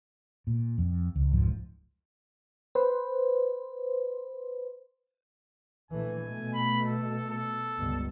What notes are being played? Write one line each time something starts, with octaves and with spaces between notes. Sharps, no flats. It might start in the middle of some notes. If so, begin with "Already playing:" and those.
A#2
F2
C#2
F1 C#2 G#2 F3
B4 C5
A#1 E3 A3 G#5
B2 A3
B5
A4
A4
G1 C#2